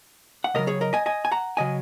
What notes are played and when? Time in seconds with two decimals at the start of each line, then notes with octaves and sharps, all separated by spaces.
0.44 F#5
0.54 C#2 C#3 F#3 A#4 D#5
0.67 G#4 C#5
0.81 A#4 D#5
0.93 D#5 G#5
1.06 D#5 G#5
1.25 G#5
1.32 F#5 A#5
1.57 C#3 F#3 D#5 G#5